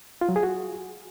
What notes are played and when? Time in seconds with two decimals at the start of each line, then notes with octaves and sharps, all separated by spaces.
0.21 F4
0.29 F#3
0.36 G#4
0.43 F#4